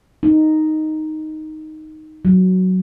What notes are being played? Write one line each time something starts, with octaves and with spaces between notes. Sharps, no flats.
D#4
F#3